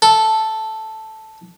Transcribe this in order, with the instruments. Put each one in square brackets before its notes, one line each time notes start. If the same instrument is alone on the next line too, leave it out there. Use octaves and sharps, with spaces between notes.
[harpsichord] A4